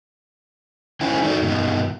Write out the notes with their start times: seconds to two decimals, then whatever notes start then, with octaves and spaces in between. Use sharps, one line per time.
1.01 D#3 C#4 E4 C5 G#5
1.23 D#4 F#4 A4 D5
1.42 G2 B2 D#3